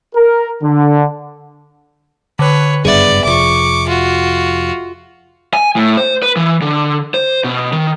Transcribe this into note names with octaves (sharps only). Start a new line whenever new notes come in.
A#4
D3
D3 B4 C#5 F#6
F#1 G2 B3 G#4 D5 E5
F1 F3 C#6 D6
F4 F#4
G#5
A2
C5
B4
E3
D3
C5
B2
D#3